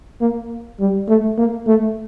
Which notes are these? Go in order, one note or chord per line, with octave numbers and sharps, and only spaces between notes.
A#3
G3
A3
A#3
A3